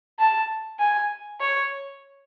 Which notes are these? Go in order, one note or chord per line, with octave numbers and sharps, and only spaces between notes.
A5
G#5
C#5